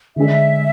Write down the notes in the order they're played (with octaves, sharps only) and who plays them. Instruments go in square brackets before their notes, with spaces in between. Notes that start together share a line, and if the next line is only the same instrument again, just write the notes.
[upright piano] D3 G#3 D4 G#4 [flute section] E5